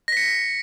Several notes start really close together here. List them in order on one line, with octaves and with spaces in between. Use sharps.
A#6 B6 C#7